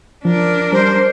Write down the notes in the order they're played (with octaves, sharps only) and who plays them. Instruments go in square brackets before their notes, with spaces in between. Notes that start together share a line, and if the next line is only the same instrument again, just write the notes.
[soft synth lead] F3 [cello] D4 A#4
[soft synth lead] G3 [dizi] C5